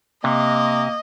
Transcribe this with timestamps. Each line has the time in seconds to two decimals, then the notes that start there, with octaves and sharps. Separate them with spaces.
0.24 C3 A#3 D#5